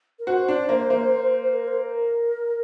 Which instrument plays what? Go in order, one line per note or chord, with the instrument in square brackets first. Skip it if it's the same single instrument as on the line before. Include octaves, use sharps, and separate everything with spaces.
[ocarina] A#4
[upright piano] F#4 [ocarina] C5
[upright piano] D4
A#3
A#3
[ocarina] A#4
C5
A#4